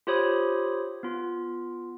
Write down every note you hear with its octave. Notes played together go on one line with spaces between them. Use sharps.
F4 G4 C5 C#5 B5 D#6
B3 F4